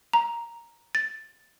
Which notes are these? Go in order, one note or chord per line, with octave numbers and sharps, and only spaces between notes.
A#5
A6